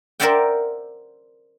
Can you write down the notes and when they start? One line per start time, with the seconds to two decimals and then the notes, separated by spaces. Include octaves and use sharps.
0.20 A#4 C5 D5 E5 F#5 G5